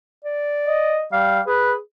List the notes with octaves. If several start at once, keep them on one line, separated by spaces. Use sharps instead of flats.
D5
D#5
G3 F5
G#4 B4